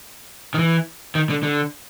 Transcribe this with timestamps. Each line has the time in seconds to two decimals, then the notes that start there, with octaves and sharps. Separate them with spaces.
0.54 D#3
0.59 E3
1.15 D#3
1.30 D3
1.43 D3